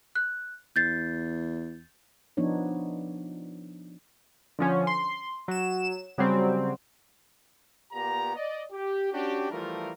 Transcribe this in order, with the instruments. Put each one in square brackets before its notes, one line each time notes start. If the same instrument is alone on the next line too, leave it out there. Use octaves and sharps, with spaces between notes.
[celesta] F#6
[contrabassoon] E2 [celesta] G6 A6 C7
[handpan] F3 B3 D4 D#4 C#5
[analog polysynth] D3 F3 C#4
C6
F#3 E7
C#3 F#3 G3 C4
[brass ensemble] A#2 B3 G4 A#5
D5 D#5
G4
C#4 D4 F#4 G4
E3 F3 G3 A3 F4 A#4